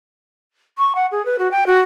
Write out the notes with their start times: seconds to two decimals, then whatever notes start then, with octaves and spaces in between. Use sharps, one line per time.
0.78 C#6
0.95 F#5
1.12 G#4
1.25 B4
1.39 F#4
1.51 G5
1.67 F#4